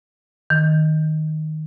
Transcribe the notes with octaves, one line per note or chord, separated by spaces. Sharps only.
D#3